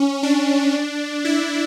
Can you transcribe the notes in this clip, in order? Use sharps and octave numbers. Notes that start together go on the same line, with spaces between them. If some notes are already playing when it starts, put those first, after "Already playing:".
Already playing: C#4
D4
E4